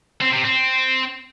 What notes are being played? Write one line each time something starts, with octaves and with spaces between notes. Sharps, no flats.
C4
C3
C4